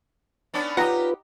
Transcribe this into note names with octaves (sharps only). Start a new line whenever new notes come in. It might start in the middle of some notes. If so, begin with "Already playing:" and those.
B3 C#4 D4
D#4 F4 G4 B4 D#5 F#5 A#5